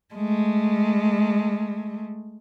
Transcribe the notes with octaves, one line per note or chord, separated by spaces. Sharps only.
G#3 A3